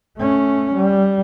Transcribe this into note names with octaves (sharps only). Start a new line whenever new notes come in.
A3 C#4
G3